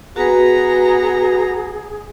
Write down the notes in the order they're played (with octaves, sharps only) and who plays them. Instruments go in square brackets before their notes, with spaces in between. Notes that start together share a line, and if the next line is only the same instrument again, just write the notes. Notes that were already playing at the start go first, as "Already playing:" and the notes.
[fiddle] B3 A#5 [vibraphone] F#4 B4 [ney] G#4